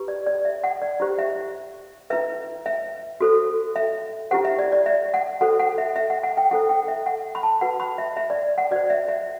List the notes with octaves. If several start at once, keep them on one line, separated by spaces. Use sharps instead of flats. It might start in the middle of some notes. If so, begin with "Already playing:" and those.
Already playing: E4 G4 B4
D5
D5
E5
F#5
D5
E4 G4 C5
E5
E4 B4 E5
E5
F#4 A4 C5
E5
E4 G4 C5 F#5
E5
D5
D5
E5
F#5
F#4 A4 C5 F#5
F#5
E5
E5
F#5
F#5
G5
E4 A4 C5 F#5
G5
E5
F#5
B5
A5
F#4 B4 F#5
B5
E5
E5
D5
F#5
F#4 C5 D5
E5
E5